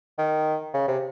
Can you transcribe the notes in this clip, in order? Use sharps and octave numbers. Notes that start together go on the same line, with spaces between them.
D#3
C#3
C3